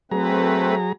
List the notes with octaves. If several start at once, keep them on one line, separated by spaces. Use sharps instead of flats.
F#3 A3 C4 G#4 B4 A#5